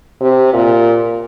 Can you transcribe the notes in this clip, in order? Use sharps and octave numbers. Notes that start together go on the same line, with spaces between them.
C3
A#2